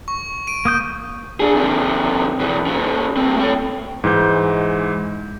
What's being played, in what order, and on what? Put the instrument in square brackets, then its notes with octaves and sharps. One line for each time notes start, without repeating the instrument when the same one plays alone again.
[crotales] C#6
D7 D#7
[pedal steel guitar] A#3 D#6 G6
[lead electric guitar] D4 G#4
C3 D#3
B2 E3
A#2 C#4
C#2 C4
A3 G5
[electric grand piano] G#2 E3 G#3 G6